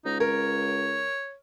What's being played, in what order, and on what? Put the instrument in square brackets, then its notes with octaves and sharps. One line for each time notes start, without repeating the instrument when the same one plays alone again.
[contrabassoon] C#2 [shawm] D#4
[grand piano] A#4 [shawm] C#5